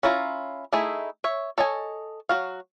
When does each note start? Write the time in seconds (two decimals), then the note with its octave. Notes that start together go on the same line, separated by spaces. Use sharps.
0.03 C#4 E4 F4 A#5
0.73 A3 D#4 E4 G#4
1.24 C#5 E5
1.58 A4 C#5 D#5 G#5
2.29 F#3 C#4 F#4 F5